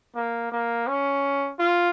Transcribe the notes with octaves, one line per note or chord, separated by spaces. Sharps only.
A#3
A#3
C#4
F4